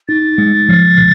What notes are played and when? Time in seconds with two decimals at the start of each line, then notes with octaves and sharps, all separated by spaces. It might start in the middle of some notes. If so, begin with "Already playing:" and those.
0.08 D#4 A6
0.38 G#3
0.69 F3
0.98 C#3